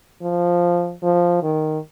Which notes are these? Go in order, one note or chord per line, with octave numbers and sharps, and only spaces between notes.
F3
F3
D#3